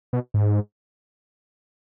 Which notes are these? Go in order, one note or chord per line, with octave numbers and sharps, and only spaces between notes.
B2
G#2